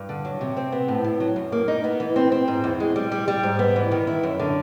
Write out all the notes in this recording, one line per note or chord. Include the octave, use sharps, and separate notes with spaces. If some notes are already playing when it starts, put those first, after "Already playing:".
Already playing: G2
D3
F#3
C3
C4
B3
A2
A2
F#3
F#2
A#3
D#4
B3
E3
C4
C4
G#2
E2
G#3
G3
G3
G3
G#2
B3
E3
D#3
E4
F#2
D3